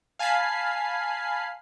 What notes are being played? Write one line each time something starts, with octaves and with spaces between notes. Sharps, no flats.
F5 G#5 A5 B5 C7